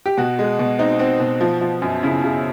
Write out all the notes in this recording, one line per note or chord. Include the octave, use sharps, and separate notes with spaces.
G4
B2 F#4
G#3
B2
C4 D#4
C4
B2
F3
F3
F#2
C#3 E4
C#3